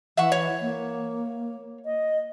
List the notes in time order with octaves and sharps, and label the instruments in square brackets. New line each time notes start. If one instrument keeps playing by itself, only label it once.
[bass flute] E3 [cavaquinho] E5 F#5 C#6
[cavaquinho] C#5
[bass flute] A#3
D#5